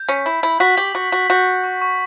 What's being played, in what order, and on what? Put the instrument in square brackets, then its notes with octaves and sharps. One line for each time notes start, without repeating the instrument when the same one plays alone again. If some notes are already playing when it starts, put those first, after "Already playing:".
Already playing: [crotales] G6
[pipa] C#4 [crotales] B6
[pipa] E4 [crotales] B6
[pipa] E4 [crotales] F#7
[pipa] F#4 [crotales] B6
[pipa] G4 [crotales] F#7
[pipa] F#4 [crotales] F#7
[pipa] F#4 [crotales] F#7
[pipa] F#4 [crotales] G6
[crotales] G6
C#6
C#6